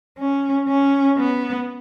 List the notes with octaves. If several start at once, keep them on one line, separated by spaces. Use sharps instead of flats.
C#4
C#4
B3